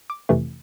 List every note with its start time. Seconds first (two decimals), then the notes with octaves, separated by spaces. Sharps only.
0.10 D6
0.29 F2 C3 E3 A3